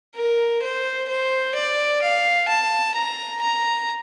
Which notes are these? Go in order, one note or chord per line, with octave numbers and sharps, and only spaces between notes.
A#4
C5
C5
D5
F5
A5
A#5
A#5